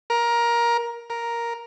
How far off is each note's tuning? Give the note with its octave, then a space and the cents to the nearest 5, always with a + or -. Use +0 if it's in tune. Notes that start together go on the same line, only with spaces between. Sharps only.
A#4 +15
A#4 +5